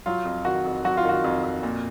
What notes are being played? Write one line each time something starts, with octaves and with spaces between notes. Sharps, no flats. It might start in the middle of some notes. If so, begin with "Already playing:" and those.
F#3 F4
F2
D#3 F#4
F2
F#3 F#4
F4
D#3 F#4
F2
F2
A#2